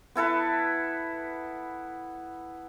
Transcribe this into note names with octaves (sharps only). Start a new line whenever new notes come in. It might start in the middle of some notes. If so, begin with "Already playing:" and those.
B3 E4 A4 B4